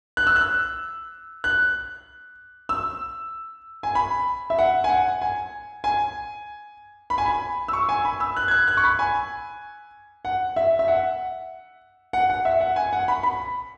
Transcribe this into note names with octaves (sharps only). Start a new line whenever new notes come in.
F#6
E6
F#6
F#6
E6
G#5
B5
E5
F#5
G#5
F#5
G#5
G#5
B5
G#5
B5
E6
C#6
G#5
B5
E6
F#6
G#6
F#6
F#6
C#6
B5
G#5
F#5
E5
E5
F#5
F#5
F#5
E5
F#5
G#5
F#5
B5
B5